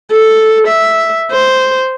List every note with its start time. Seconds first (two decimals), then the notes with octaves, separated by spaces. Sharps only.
0.11 A4
0.68 E5
1.31 C5